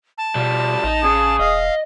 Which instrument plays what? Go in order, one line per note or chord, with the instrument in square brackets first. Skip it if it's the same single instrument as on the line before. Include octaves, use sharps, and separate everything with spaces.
[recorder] A5
[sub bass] B2 [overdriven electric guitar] F3 G3
[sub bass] A1 [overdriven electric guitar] D#4
[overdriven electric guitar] C#3 [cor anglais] G#4
[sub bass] E1 [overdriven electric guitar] D#5 [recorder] F5